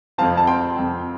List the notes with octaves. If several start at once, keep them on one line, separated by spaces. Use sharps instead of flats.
F2 F3 C4 F5 A5
A5
G5 C6
F2 F3 C4